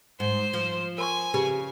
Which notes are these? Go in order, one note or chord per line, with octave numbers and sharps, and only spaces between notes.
G#2 C5
F3
A#4 G#5 C6 C#6
C#3 G4 G#4 B4